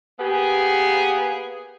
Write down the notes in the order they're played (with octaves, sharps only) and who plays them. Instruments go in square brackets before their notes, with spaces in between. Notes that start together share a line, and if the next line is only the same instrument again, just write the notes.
[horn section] A#3 B3 G4 G#4